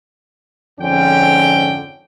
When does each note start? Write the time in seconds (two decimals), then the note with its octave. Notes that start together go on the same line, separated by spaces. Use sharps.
0.79 F2 G#2 D3 C#4 G5